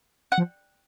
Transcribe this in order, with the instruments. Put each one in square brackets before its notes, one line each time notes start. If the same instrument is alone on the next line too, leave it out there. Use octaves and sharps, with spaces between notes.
[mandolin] F#5
[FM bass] F3